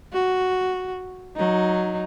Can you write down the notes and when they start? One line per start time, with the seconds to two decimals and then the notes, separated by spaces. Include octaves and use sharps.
0.13 F#4
1.36 F#3 D#4